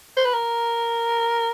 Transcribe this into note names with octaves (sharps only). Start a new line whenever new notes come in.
C5
B4
A#4